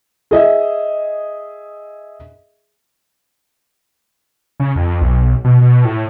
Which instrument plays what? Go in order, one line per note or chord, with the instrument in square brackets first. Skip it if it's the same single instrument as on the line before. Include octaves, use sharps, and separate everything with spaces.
[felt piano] G#4 D#5 E5
[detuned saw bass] C#3
F2
B1
B2
B2
A2